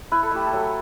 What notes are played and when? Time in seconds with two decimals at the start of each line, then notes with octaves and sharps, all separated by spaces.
0.12 E4 B4
0.23 A4
0.31 A3 G4
0.47 A4
0.53 F#3